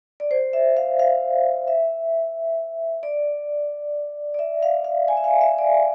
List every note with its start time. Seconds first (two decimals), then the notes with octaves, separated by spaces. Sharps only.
0.20 D5
0.31 C5
0.53 E5
0.77 F5
0.99 F5
1.68 E5
3.03 D5
4.34 D5
4.39 E5
4.63 F5
4.84 F5
5.08 G#5
5.17 E5
5.24 F5
5.41 E5
5.58 D5